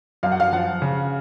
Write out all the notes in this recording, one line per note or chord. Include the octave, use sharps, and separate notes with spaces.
F#2 F5
F#5
F5
F3 F#5
C#3